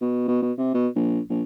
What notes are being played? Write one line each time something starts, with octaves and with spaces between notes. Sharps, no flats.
B2
B2
B2
C3
B2
A#1
A#1